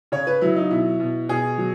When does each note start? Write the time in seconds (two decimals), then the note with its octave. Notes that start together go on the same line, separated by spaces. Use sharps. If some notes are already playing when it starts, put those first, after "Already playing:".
0.12 C#3 C#5
0.27 B4
0.41 F#3 E4
0.56 D#4
0.71 B2 E4
1.00 B2
1.29 B2 G#4
1.58 F#3